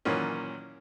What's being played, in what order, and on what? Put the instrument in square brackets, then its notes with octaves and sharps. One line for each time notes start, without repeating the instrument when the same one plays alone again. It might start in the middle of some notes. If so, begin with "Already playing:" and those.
[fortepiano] A#2 D#3 E3 F#3 A#3 C#4